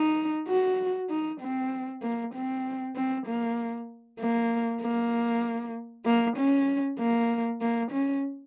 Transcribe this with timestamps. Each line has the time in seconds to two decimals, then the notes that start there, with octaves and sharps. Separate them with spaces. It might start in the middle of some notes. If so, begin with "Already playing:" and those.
Already playing: D#4
0.49 F#4
1.10 D#4
1.41 C4
2.02 A#3
2.34 C4
2.96 C4
3.27 A#3
4.20 A#3
4.82 A#3
6.06 A#3
6.37 C#4
6.99 A#3
7.61 A#3
7.91 C#4